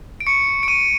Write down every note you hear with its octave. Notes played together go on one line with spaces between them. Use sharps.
D7
C#6 C#7
D7
C#6 D#7